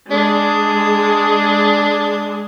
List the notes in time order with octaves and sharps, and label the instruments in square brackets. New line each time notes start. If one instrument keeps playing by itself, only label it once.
[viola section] G#3 G#4 [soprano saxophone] D4